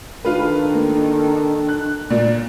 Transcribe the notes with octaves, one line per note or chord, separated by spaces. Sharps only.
D#3 D4 F4 A4 B4
A#3
F#6
A#2 D5